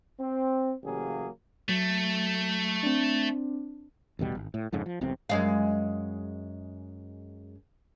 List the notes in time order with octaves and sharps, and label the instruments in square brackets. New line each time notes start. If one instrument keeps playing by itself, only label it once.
[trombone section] C4
A1 C#3 F#3 A#3 G4 G#4
[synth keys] F#3 [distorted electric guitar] A3
[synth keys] C4 D4
[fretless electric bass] A1 D#2 B2 G3
G#1
A2
F2 G#2 C#3
F3
E1 B1 C3 C4
[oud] F#2 G#3 F5